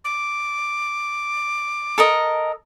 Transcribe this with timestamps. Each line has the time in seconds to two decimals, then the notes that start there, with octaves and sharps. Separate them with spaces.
0.05 D6
1.98 A4 A#4 D#5